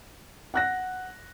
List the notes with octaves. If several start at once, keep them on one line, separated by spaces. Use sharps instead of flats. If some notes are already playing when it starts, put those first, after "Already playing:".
F#5 F#6 A#6